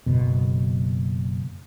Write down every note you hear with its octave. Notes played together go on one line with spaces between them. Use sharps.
F#1 B2